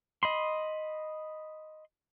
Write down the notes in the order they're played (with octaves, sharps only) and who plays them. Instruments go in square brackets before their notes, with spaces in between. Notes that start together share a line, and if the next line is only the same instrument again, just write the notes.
[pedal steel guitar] D#5 B5 C6